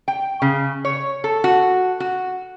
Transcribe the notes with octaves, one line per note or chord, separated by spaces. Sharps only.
G5
C#3
C#5
A4
F#4
F#4